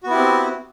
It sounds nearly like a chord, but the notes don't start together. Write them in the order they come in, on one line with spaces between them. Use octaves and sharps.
F#4 B3 E4 G4 C4